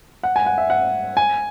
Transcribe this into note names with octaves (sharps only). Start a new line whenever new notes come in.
F#5
G#5
F#5
E5
F#5
G#5